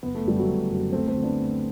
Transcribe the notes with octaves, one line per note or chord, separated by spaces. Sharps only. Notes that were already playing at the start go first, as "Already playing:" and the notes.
F#1 B3
A3
F#2 D3 F#3 G3
F#3 A3
F#1
F#2 D3 F#3
D2 A3 C4
A3 C4
D3 F#3
B3 D4
D2